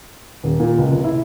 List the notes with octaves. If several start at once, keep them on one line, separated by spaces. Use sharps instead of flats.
D#1
A#2
C#2
F1
E4